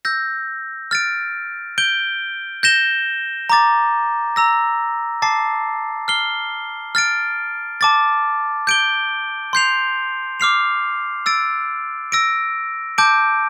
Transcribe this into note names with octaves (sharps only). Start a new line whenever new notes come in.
E6 G6 A#6
F6 A6 D7
G6 D7 G7
G6 A#6 E7 G7
A#5 D6 A6
A#5 E6 A#6
A5 D6 A6 C7
F6 C7 G7
F6 A6 D7
A5 D6 A6
G6 D7 G7
C6 G6 C7 F7
D6 F6 C7 F7
E6 A6 D7
E6 A#6 D7
A5 D6 G6 D7